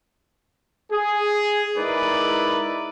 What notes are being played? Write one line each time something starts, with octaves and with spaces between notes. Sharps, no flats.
G#4
G#3 D#4 E4 A#4 B4 D5